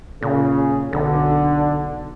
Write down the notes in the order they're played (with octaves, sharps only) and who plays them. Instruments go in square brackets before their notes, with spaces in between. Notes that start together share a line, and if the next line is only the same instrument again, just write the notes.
[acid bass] A#2 [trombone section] C#3
[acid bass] B1 [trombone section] D3